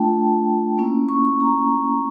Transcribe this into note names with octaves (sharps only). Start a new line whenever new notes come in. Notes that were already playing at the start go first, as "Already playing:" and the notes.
Already playing: A3 D4 F4 G5 A5
A#3 C#4 E4
C#6
C#6
A#5